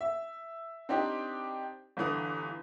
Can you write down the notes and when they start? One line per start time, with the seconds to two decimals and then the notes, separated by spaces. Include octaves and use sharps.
0.01 E5
0.89 C4 D4 D#4 G4
1.97 G1 D3 E3 D#6